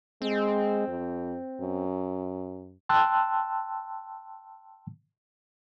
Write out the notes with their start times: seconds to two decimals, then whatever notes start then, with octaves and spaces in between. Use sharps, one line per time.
0.22 G#3 C4
0.88 F2
1.61 F#2
2.89 G5 A5 C6 E6 F#6